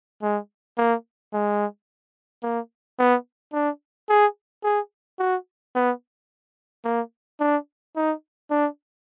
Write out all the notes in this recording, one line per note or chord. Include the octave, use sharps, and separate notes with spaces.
G#3
A#3
G#3
A#3
B3
D4
G#4
G#4
F#4
B3
A#3
D4
D#4
D4